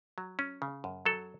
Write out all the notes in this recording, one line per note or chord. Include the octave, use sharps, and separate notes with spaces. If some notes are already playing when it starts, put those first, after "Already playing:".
F#3
C#4
C#3
F#2
F#3 A4